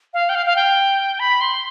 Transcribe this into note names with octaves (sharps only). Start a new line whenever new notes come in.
F5
G5
F5
F5
G5
B5
C6